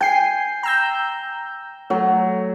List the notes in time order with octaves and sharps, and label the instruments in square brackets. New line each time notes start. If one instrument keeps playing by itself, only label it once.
[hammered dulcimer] G5 [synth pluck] G#5 C7
[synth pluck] A#5 E6 G6
[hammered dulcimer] F#3 [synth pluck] A3